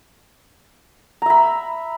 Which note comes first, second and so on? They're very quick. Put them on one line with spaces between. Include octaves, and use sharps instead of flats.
A#5 E5 B5